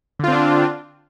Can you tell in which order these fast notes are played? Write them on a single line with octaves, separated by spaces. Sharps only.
D3 F4 C4 D4